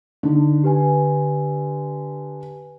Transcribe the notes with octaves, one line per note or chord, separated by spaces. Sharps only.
D3 D#4
G4 B4 G#5